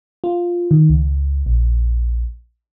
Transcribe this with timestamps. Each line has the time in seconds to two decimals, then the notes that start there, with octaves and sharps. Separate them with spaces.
0.24 F4
0.71 D#3
0.90 C#2
1.46 A#1